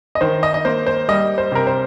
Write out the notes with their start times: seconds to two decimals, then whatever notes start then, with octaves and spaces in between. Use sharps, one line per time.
0.15 D#5
0.21 D#3 C5
0.43 D#5
0.54 D#5
0.65 A#3 C5
0.87 C5
1.09 G3 D#5
1.38 C5
1.52 C3 A#4
1.67 C5